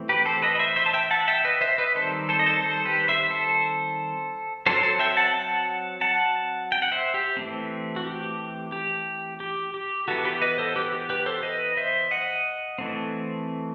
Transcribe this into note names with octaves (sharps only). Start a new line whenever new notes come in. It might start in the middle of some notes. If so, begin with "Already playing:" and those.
Already playing: E3 A3 C4
G4 B4
A4 C5
B4 D#5
D#5
C5 E5
C5 E5
A5
E5 G5
F#5 A5
E5 G5
B4 D#5
C5 E5
B4 D#5
D#3 G3 C4 A4 C5
A4 C5
D#5
A4 C5
A4 C5
G4 B4
C5 E5
A4 C5
F#3 C4 A4 C5
A4 C5
E5 G5
F#5 A5
F#5 A5
F#5 A5
G5
F#5
C5 E5
G4
E3 A3 C4
F#4
G4
G4
G4
G4
E3 B3 F#4 A4
G4 B4
B4 D#5
A4 C5
G4 B4
G4
G4 B4
A4 C5
B4 D#5
C5 E5
D#5 F#5
E3 A3 C4